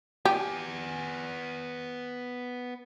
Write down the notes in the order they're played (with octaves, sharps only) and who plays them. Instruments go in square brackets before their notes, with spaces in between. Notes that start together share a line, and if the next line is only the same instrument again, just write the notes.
[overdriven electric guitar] B3 G#5 [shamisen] G4